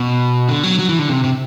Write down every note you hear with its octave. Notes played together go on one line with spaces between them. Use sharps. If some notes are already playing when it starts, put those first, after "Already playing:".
Already playing: B2
D3
F#3
F#3
E3
D3
C3
C3